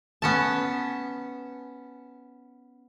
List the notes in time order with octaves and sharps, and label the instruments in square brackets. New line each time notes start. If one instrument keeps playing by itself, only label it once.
[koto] B3 C#4 A5